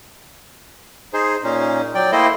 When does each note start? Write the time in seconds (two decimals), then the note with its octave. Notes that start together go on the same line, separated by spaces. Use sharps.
1.13 D#4 G#4 C5
1.44 A#2 C#4 D#4
1.95 F#3 D5 G5
2.12 A3 A#3 E4 C5 D#5 G5